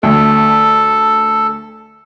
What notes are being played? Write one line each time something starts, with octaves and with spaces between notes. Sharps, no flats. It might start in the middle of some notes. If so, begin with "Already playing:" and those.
D2 A4